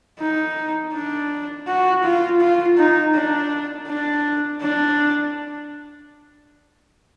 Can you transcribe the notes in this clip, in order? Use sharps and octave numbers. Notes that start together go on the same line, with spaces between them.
D#4
D4
F#4
F4
F4
D#4
D4
D4
D4